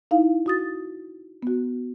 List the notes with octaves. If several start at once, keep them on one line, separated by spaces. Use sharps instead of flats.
D#4 E4 F5
F#4 D#6 A6
B3 F#4